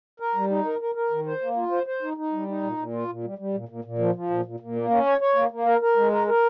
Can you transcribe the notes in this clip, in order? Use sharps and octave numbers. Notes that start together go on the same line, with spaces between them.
A#4
G3
D#4
A#4
A#4
A#4
D#3
C5
A#3
F4
C5
C5
D#4
D#4
G3
D#4
A#2
A#2
F4
A#2
G3
G3
A#2
A#2
A#2
F3
F3
A#2
A#2
A#2
A#3
C#4
C#5
C#5
A#3
A#3
A#4
A#4
G#3
A#4
A#4